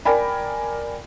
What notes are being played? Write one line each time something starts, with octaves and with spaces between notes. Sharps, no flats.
A#4 D5 G5 G#5 B5